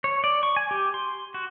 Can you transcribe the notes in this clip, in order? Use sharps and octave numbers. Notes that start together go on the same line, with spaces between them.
C#5
D5
C#6
G#5
G4
C6
F#4